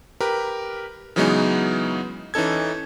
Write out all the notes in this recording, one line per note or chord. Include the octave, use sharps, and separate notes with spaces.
G4 A#4 B4
C#3 E3 F#3 G#3 B3 D#4
E3 C#4 D#4 A4 G#6